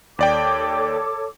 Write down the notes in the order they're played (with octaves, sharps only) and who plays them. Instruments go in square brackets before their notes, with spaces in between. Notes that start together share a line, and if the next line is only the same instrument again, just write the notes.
[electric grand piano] D#2 D5 G5 [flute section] A4 C#5 D6